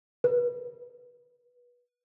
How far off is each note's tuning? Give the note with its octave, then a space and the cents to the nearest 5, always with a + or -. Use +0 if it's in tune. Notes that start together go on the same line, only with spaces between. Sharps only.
B4 -20